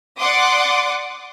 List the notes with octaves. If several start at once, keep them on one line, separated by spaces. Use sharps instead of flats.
D5 F#5 C6 D6 D#6